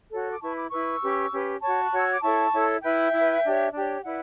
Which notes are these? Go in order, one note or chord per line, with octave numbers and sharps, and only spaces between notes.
F#4 A4 C#5
D6
E4 B4 A5 C#6
B5 D6
E4 B4 C#6 E6
C#4 G4 B4
C#4 G4 B4
F#4 C#5 A5 C#6
F#6
F#4 C#5 E6
D6
E4 A4 C#5 A5 C#6
E4 A4 C#5
E4 B4 E5 G5
E4 B4
D4 G4 C#5
D4 G4 C#5
E4 B4 D5 F#5